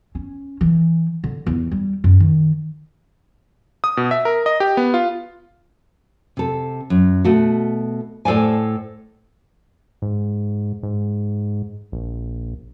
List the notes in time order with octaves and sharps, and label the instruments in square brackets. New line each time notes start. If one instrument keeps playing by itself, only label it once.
[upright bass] C#4
E3
D3
E2
G3
F#2
D#3
[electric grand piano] D#6
B2
E5
A#4
D#5
G4
B3
F4
[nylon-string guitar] C3 A4
F#2
B2 A3 F#4
A2 A4 C5 D5 G#5
[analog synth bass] G#2
G#2
A#1